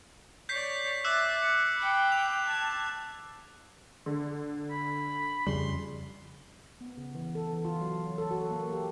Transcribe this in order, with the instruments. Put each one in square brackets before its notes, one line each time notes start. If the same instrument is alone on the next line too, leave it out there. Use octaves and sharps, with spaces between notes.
[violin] C#5 D5 [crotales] G6 B6 C7
[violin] E5 A6 [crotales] D6 E6 F#6
[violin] C#7
G5 B5
[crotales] F7
[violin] A5 G#6
[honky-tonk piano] D3
[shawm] B5
[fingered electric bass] F2 C#3 G3 [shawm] C6 [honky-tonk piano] F#7
[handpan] B3
C#3
E3
A4
E3
F4
F#3
A4
F#4
A#3
G4